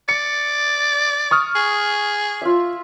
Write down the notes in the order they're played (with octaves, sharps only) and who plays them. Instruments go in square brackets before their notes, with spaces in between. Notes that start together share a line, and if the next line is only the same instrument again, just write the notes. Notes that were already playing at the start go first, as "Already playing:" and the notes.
[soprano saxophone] D5 [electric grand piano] C#7
[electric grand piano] C#6 D#6 F6
[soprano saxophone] G#4
[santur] F4 E5